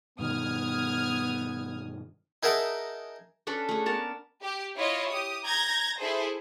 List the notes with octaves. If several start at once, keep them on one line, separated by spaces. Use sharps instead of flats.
G2 B2 D#3 B3 D#6 F6 G#6
D#4 G#4 A#4 E5 F#5 A5
C#4 D4 A4 B4
A3 G#4
B3 A#4 A5
G4
E4 F4 C#5 D#5
G4 D#6
A#5 G6 G#6 A#6
E4 G#4 A4 C5